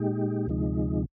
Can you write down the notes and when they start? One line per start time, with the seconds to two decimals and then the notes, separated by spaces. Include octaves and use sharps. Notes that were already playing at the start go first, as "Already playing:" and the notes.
Already playing: A#2 G#3 D#4 G4
0.47 D2 C3 F3 G#3 D#4